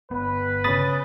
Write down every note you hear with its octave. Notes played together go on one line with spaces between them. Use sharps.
G1 B3 B4
C#3 B5 D#6 A6